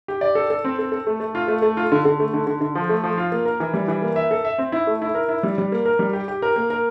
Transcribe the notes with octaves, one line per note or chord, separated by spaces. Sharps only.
G4
D5
A4
A4
C4
A4
A4
A3
A3
F4
A3
A3
F4
D3
D3
A3
D3
D3
D3
F3
A3
F3
F4
A#3
A#4
E3
G3
E3
A#3
E5
A4
E5
C4
E4
A3
E4
A#4
E4
G3
G3
A#3
A#4
G3
G4
G4
A#4
A#3
A#4